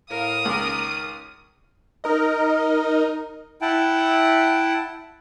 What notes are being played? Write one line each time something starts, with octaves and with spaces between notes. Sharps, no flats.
A2 A#4 F5 D#6
C#2 D#3 C#6 F6
D#4 A#4 D#5
E4 F#5 G5 A5